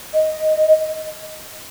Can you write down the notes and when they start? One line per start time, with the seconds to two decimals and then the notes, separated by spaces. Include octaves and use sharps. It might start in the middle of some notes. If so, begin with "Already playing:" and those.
0.14 D#5